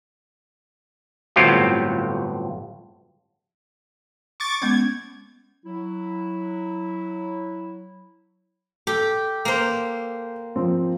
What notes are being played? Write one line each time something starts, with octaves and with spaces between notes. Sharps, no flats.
G1 A2 F#3 C4 F4 G4
C#6 D6 A6
G#3 B3 C#4 G#6
F#3 E4
G4 A4
A#3 C5
F3 C4